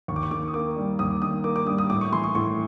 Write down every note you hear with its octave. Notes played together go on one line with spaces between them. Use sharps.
D#2 C#6
D6
C#6
D#3 D6
D#6
A#3 D6
G3
D#2 D#6
D6
D#3 D#6
A#3 D6
D6
G3 D#6
D#6
A2 D6
C#6
E3 C6
C#6
A2 C#6